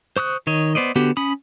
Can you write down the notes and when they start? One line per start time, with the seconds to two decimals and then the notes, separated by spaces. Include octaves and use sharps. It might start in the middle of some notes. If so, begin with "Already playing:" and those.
0.16 C5 C#6 D#6 F#6
0.47 D#3 C#5 D#5
0.75 B3 C5 D5 D#5
0.96 D3 B3 F#4 G4
1.17 C#4 B5 D#6